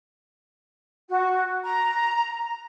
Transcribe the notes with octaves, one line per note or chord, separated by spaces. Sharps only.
F#4
A#5